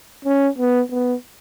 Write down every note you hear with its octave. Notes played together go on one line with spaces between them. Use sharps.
C#4
B3
B3